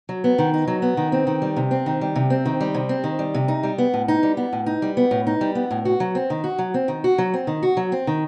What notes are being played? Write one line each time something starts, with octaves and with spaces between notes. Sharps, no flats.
F#3
B3
D#3
D#4
F#3
B3
D#3
C4
D#3
G3
C3
C4
D#3
G3
C3
C4
D#3
G3
C3
C4
D#3
G3
C3
D#4
G3
B3
A2
D#4
G3
B3
A2
D#4
G3
B3
A2
D#4
G3
B3
A2
F#4
F#3
C4
D#3
F#4
F#3
C4
D#3
F#4
F#3
C4
D#3
F#4
F#3
C4
D#3